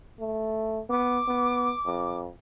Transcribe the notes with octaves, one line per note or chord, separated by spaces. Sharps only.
A3
B3 D6
B3
F2